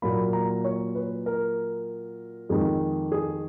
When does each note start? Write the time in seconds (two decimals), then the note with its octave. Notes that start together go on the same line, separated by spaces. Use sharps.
0.02 A#2 F#3 A#3 B5
0.33 A#5
0.64 C#5
0.95 B4
1.26 A#4
2.50 F2 D#3 G#3 G#4
3.12 G#4